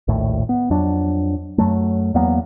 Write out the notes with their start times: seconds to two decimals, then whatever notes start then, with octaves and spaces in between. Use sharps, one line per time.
0.08 A#1 D#2 A2
0.49 B3
0.70 F2 F#3 D4
1.58 F#2 F#3 A3
2.14 E2 F#3 A#3 B3